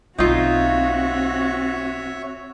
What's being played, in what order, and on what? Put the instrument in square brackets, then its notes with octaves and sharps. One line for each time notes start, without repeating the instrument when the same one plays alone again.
[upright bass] B1 A#3 [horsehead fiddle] C4 F#4 [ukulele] D#4 F4 [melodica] C#5 E5